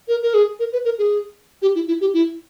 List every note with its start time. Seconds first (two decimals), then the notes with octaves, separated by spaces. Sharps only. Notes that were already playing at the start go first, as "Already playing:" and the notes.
0.08 A#4
0.22 A#4
0.34 G#4
0.60 A#4
0.73 B4
0.85 A#4
0.99 G#4
1.62 G4
1.75 E4
1.88 E4
2.01 G4
2.14 E4